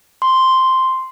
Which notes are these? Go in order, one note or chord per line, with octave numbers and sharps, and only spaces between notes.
C6